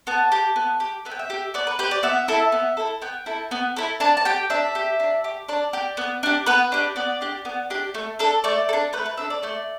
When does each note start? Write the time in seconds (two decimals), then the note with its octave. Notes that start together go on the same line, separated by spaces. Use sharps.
0.07 B3 A5
0.32 G4
0.56 B3
0.80 G4
1.05 B3 E5
1.11 G5
1.19 E5
1.30 G4
1.54 B3 D5
1.67 B4
1.79 G4 B4
1.91 D5
2.03 B3 E5
2.28 E4 A4
2.52 B3
2.77 E4 A4
3.02 B3 G5
3.26 E4 A4
3.51 B3
3.77 E4 A4
4.00 D4 A5
4.17 A5
4.25 G4 G5
4.50 D4 E5
4.75 G4
5.00 D4
5.24 G4
5.49 D4 D5
5.73 G4
5.97 B3
6.23 D4 G4
6.46 B3 B4
6.72 D4 G4
6.96 B3 D5
7.21 D4 G4
7.45 B3
7.70 D4 G4
7.94 A3
8.19 D4 A4
8.44 A3 D5
8.69 A4
8.73 D4
8.93 A3 B4
9.06 B4
9.17 D4 A4 E5
9.30 D5
9.43 A3 D5